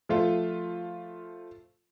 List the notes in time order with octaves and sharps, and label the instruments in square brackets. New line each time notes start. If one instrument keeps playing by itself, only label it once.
[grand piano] F3 A3 F4